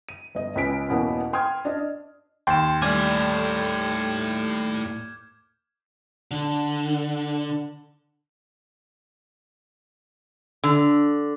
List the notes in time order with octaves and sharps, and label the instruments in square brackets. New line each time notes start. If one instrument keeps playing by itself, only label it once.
[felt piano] D#7
G1 D#5
C#2 C#4 B4 B6 D7
E2 B2 A#3 B3 C#4
G5 C6 D#6 F6 G#6
D4 D#5
[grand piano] D#2 G5 C6 [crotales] G6 G#6 E7
[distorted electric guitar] A2 G#5 [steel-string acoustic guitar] G3 A3 [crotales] D6 F6 G#6
[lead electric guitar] D3
[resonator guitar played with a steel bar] D3